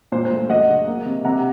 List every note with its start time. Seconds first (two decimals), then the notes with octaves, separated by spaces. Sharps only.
0.12 A#2 C5
0.25 C5
0.31 A3
0.49 F#2 D#5 F#5
0.69 C#3
0.87 A#3
1.06 C3
1.25 C3 F#5 A#5